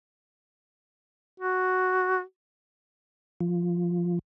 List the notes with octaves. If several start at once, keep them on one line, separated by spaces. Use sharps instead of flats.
F#4
F3